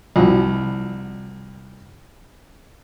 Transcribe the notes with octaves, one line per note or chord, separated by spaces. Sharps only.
C2 F3 F#4